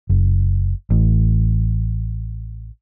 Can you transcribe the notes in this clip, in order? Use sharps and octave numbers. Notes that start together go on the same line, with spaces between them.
F#1
A1